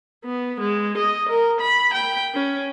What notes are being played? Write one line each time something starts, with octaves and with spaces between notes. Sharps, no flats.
B3
G#3
D#5
A#4
B5
G5
C#4